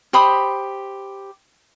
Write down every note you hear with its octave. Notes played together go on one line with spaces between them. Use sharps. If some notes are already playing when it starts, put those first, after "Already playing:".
G4 C5 B5 D#6